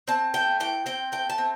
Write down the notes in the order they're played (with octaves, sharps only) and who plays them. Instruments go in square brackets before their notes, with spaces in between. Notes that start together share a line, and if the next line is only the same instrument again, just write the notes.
[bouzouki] C4 A5
A3 G5
E3 G5
C4 G5
A3 G5
A5
C4